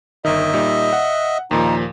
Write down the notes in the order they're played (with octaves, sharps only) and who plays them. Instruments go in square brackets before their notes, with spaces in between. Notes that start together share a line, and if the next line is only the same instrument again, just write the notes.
[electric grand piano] G1 D#3 [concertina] D#5 E5
[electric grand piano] A#2 G3 D#4
F#5
[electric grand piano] D#2 A#2 F3 [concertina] D#4